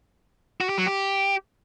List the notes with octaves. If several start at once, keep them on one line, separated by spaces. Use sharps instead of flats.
F#4
G4
F#3
G4